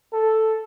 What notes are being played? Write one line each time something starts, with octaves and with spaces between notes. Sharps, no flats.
A4